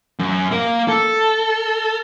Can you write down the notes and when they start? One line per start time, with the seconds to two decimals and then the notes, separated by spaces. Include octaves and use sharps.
0.19 F#2
0.51 A#3 A#4
0.88 A4